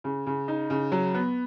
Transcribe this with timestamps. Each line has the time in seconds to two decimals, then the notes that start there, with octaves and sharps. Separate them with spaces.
0.04 C#3
0.27 C#3
0.48 D#4
0.70 C#3
0.92 F#3
1.14 B3